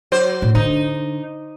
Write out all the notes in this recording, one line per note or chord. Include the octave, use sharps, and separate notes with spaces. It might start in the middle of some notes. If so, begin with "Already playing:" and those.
F#3 C5
A2
D3 D4 D#4